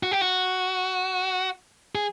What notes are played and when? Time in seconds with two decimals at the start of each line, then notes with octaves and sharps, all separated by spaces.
0.03 F#4
0.12 G4
0.21 F#4
1.95 G#4